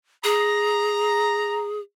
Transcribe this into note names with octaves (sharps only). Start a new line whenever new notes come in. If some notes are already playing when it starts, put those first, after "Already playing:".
G#4 A#5